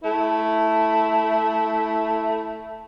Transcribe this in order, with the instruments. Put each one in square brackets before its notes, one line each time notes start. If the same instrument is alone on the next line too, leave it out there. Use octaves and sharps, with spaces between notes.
[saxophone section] A3 E4